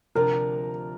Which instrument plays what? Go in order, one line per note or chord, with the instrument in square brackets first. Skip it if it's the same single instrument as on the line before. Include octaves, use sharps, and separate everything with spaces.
[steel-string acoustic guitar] D2 C3 F3 D4 [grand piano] A#4